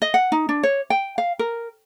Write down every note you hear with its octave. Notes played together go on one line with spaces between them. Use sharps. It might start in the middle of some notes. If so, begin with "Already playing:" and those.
D#5
F#5
D#4
D4
C#5
G5
F5
A#4